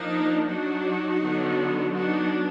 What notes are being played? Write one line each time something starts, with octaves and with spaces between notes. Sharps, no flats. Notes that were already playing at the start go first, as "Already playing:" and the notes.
Already playing: F3 A#3 D4 D#4
F#3 D4 D#4 F#4
D3 F#3 B3 D4
F#3 B3 D4 D#4 F#4